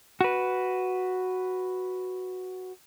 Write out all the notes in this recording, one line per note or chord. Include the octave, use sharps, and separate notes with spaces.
F#4 B4